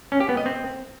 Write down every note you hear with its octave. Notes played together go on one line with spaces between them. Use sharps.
C#4
G4
B3
D#5
C4